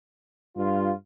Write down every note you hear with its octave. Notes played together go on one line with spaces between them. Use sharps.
G2 F4